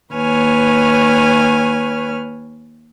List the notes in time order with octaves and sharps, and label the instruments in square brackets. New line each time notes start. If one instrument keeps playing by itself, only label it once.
[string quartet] D#2 B4 C#5 G#5 F6